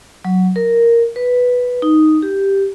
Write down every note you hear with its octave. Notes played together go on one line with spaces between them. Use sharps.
F#3
A#4
B4
D#4
G4